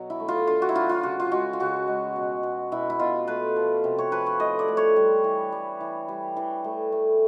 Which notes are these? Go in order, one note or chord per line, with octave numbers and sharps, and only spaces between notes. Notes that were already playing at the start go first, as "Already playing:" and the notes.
Already playing: B2 F#3
E4
A3
F4
D3 F4
F#4
E4
F#3 F4
F4
C#3 F#4
F4
G#3 F#4
F4
C#3 F#4
G#3
B2
B2
B2 E4
E4
B2 F4
A3 B4
F3
C3
C#5
F3 B4
C#5
A2 D#5
D5
A2
C#5
G3
E3
G3
E3
G3
E3
A3
A3